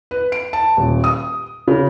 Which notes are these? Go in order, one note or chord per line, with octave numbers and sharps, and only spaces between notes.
B4
D7
A5
D#1
D#6
C#3